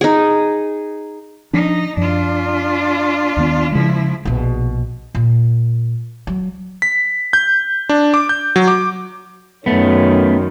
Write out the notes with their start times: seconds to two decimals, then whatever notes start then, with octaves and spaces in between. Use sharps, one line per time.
0.01 D#4 G#4
1.53 F3 D4 D#4
1.97 F#2 F3 D4 F4
3.37 D#2 D#3 B3
3.72 C#3 F3 G#3 E4
4.25 A#1 B2
5.15 A#2
6.27 F#3
6.82 B6
7.33 G6
7.89 D4
8.14 D6
8.29 G6
8.56 F#3
8.68 D6
9.66 F#2 D#3 A3 B3 C#4